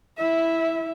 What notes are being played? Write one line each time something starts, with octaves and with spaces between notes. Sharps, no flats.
E4 E5